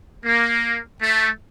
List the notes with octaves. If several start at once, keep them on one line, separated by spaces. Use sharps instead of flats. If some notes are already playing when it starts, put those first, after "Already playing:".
A#3
A3